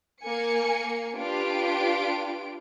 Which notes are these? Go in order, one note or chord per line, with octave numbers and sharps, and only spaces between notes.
A#3 G#5 C#7
D4 F4 G4 B4 D7